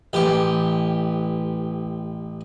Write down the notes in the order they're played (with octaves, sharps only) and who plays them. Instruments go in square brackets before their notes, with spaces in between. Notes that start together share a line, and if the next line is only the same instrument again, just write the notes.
[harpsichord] A1 G4